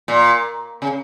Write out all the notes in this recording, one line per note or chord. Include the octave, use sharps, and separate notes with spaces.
A#2
C#3